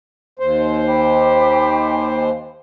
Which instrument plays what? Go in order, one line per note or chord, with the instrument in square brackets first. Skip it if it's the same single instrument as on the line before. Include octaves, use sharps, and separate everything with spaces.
[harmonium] D#2 C5
[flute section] G5 B5 D6